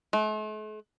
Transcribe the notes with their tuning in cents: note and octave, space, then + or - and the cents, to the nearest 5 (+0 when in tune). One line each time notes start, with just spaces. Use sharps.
A3 -45